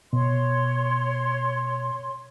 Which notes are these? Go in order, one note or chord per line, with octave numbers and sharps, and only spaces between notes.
B2 C#5 C6